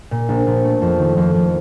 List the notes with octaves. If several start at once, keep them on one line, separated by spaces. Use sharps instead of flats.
A#2
A#1
A#1
A3
F2
D#3
F2
F2